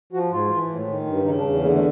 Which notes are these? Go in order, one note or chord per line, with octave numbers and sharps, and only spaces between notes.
F3 F#4
G#2 F4
E3
A2
D#3
G2
C#3 D#4
D4
E2
D3 A#3
A3